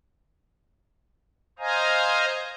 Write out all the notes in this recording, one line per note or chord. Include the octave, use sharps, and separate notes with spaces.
C5 D#5 F5 G#5 A#5